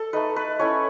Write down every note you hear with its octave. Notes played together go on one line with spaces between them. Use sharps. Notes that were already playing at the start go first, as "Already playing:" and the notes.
Already playing: A4
A3 D#4 B4
B4
A3 C#4 E4 C#5